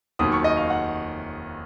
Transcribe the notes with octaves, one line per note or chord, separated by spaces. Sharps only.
F1 D#2 D#3 F#3 D#6
C#6
D#5
F5
F#5